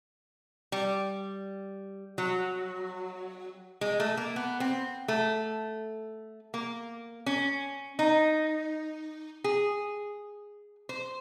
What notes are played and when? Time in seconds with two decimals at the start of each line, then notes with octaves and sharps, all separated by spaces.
0.72 G3
2.18 F#3
3.81 G#3
4.00 A3
4.17 A#3
4.36 B3
4.60 C4
5.08 A3
6.54 A#3
7.26 C#4
7.99 D#4
9.44 G#4
10.89 C5